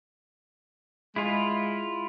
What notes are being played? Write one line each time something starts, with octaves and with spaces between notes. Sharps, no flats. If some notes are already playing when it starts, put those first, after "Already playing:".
G#3 E4 F4